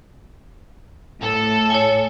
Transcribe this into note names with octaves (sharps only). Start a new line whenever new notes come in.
A2 A4
C#5 G#5